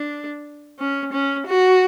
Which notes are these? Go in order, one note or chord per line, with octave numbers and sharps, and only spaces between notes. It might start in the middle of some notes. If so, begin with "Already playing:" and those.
Already playing: D4
C#4
C#4
F#4